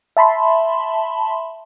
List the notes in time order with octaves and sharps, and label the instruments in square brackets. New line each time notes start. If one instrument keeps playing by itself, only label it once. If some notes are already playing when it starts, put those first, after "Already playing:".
[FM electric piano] E5 A5 B5 C6